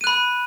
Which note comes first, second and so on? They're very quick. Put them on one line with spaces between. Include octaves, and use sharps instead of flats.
D#7 F#6 B5